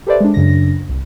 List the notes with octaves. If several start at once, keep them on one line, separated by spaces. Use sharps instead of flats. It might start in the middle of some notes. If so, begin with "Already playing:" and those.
G4 A4 B4 C5 D5 E5
G#3 D4
F#2 C#3 D4 A#6
C2